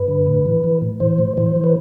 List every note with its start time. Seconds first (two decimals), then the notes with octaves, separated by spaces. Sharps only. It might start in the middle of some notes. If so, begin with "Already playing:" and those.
Already playing: G2 B4
0.08 D3
0.27 A2
0.46 E3
0.64 E3
0.82 A2
1.00 E3 C5
1.18 A2
1.37 E3 C5
1.56 E3
1.64 B4